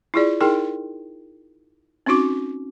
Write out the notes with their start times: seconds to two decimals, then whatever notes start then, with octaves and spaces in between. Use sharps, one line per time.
0.14 E4 F4 G#4 D5
0.41 D#4 E4 G#4 A#4 G5
2.06 C4 C#4 D#4 F#4 D6